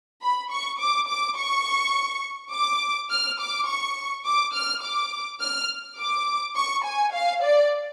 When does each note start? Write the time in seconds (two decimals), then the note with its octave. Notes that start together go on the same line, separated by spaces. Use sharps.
0.22 B5
0.51 C#6
0.80 D6
1.08 D6
1.37 C#6
2.53 D6
3.10 F6
3.40 D6
3.67 C#6
4.25 D6
4.54 F6
4.83 D6
5.41 F6
5.99 D6
6.56 C#6
6.85 G#5
7.13 F5
7.43 D5